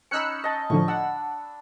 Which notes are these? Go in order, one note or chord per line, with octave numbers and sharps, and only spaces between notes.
C#4 D#4 B5 E6 F#6 C#7
D#5 A5
A2 D3 F3 C#6
D4 F#5 E6